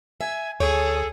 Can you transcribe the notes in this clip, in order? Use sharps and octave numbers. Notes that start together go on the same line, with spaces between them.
E5 G#5
D2 G#4 A4 C#5